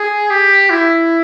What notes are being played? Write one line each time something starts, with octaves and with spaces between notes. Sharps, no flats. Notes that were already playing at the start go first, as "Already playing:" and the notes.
Already playing: G#4
G4
E4